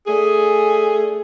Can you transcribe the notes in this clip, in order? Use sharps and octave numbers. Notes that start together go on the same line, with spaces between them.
A3 D4 G#4